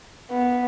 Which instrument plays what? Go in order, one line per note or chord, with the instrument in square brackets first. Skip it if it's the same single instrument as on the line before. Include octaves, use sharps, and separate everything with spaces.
[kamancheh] B3